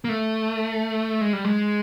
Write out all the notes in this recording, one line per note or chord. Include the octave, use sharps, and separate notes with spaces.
A#3
A3
G#3
G3
G#3